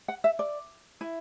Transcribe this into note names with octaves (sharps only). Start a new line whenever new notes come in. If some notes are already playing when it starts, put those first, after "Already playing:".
F#5
E5
D5
E4